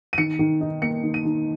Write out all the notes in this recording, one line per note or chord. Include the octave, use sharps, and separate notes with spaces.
D#7
D#3 C#7
D#3
D#4
A#3 C#7
D#3
D#7
D#3